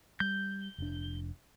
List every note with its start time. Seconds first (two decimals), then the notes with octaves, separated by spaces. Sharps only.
0.20 G3 G6
0.78 F1 D4